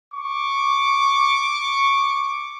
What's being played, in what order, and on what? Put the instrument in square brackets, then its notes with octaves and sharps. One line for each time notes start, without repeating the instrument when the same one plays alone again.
[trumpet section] C#6 D6